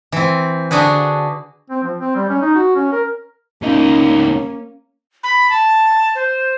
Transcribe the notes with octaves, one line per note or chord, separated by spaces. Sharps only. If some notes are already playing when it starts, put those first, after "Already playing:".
E3 C4
D3 D4 F#4 G#4 B4
C4
F3
C4
G3
C#4
D#4
F#4
C#4
A#4
C#2 A#3 C#4 D#4
B5
A5
C5